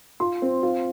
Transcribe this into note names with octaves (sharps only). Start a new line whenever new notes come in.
F4 C6
C4
F4